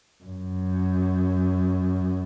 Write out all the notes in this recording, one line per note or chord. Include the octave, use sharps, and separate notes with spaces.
F#2